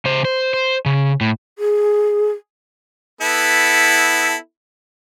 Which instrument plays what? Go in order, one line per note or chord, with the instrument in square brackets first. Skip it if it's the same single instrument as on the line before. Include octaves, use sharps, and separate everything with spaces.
[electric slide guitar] C#3 C5
C5
C5
C#3
A2
[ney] G#4
[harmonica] B3 E4 A4